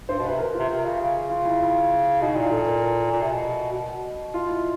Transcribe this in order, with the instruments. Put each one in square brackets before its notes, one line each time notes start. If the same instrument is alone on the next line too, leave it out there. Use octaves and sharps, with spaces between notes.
[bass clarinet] G2 [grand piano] C5
[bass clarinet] B2
[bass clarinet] C3 [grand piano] B4
[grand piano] A#4
F4
[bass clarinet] C3
C3
C#3
C#3
[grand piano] F4
E4
E4
[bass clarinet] B2 [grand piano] D#4
[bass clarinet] A#2 [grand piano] E4
[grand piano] A4
A#4
A#4
[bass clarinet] A#2
C3
B2
B2
[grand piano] F4
E4